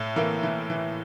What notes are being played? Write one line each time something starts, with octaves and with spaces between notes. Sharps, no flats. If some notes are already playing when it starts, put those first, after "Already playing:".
Already playing: A2
E3 A#3 A#4
E3
E3